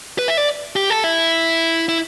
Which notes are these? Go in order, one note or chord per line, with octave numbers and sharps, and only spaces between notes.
B4
E5
D5
G4
A4
E4
E4